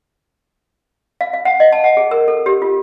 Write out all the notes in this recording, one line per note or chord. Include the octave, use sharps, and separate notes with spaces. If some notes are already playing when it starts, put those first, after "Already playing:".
F5
F5
F#5
D#5
A5
F#5
G#4
A#4
A4
G4
F4